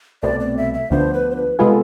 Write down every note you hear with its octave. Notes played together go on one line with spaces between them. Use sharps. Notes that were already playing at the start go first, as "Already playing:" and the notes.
C2 B2 A3 C4 D5
D5
E5
E5
D2 D3 F3 B3 D4 C5
B4
C5
B4
C3 G#3 B3 F4 G#4 A4